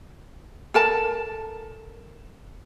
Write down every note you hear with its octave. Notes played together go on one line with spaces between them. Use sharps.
A4 A#4 A5